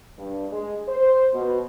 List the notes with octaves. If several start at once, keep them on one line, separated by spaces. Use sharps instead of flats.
G2
G#3
C5
B2